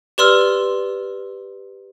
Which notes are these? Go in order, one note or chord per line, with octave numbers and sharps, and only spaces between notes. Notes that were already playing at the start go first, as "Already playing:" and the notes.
G4 B4 D5 C6 E6 F6